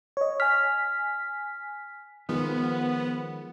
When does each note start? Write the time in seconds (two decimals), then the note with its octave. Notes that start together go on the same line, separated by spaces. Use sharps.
0.17 C#5 D#5
0.40 G#5 F6 B6
2.29 D#3 F3 G#3 B3